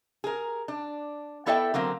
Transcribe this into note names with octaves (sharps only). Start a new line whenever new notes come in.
G#4 A#4
D4
B3 E4 A4 D5 E5 G5
D3 F#3 A#3 C4